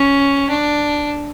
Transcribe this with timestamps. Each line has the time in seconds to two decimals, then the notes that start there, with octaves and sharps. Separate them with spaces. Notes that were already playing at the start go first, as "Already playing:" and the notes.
Already playing: C#4
0.50 D4